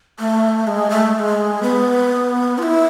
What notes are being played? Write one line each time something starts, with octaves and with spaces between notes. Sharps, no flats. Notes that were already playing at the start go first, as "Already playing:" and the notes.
A3
G#3
A3
A3
G#3
B3
F4
E4